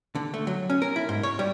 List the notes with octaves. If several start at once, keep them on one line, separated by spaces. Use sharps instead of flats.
D3
A3
F#3
C#4
A#4
E4
G#2
C#5
G3